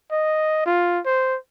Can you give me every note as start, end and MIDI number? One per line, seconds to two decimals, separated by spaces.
0.12 0.64 75
0.66 1.00 65
1.06 1.37 72